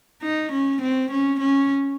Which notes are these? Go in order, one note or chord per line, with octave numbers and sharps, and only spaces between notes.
D#4
C#4
C4
C#4
C#4